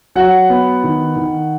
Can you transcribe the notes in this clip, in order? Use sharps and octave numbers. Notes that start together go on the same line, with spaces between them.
F#3 F#5
B3
D#3
D#3